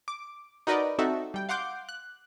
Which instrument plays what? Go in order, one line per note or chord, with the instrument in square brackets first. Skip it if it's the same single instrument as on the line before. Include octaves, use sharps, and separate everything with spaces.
[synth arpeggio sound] D6
D#4 F#4 A#4 B4 D5 D#5
C4 D#4 F#4 A4 E5
G3 G5
F5 F#5 C6 D6 G6
F#6